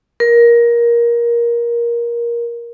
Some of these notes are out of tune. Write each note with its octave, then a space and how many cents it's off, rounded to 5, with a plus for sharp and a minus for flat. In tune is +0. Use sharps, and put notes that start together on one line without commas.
A#4 +15